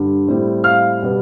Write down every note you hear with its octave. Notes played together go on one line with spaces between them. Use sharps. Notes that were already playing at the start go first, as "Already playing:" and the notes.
Already playing: G2 D3
A2 G3 C4
F5 F6
B2 G3 B3